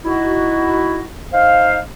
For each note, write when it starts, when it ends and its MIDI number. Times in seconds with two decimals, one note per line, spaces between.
0.04 1.03 63
0.04 1.03 64
0.04 1.03 66
1.32 1.78 63
1.32 1.78 72
1.32 1.78 77